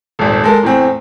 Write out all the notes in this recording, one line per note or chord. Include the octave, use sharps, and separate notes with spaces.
D#1 G#1
G#3 A4 A#4
E2 A2 C4